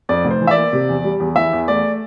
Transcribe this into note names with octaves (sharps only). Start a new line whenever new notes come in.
F2 D5
F1
C5
E3
E5
D5
A#3
C3
E2
G3
E2
E3 E5
E2
A3 D5